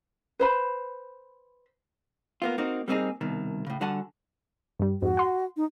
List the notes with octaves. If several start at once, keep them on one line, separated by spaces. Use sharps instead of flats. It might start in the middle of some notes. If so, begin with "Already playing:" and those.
B4 C5 B5
A#3 B3 F4
A#3 C4 D#4 F#4
G3 A#3 C4 C#4 D#4 G#4
C2 B2 D#3
A2 C#3
D3 G3 F#4 F#5 G#5 A5
G2 G3
F2 G#2 F#4
F#5 C6
D#4